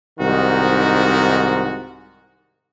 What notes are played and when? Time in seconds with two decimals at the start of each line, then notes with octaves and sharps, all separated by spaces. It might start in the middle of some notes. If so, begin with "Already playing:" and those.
0.19 C2 G#2 D#3 F#4